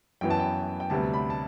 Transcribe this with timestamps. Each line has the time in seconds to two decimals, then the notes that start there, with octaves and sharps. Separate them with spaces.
0.21 F#2 E3 B3 G5
0.30 A5
0.40 G5
0.80 G5
0.90 D2 C3 G3 B3 A5
1.13 B5
1.30 A5